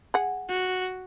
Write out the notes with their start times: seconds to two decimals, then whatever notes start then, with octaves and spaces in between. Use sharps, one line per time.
0.14 G#4 F#5
0.49 F#4